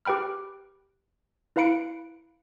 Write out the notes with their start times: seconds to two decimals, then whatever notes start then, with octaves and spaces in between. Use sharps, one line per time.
0.05 G4 B4 G5 B5 F6
1.56 E4 B4 F5 B5 C#7 D7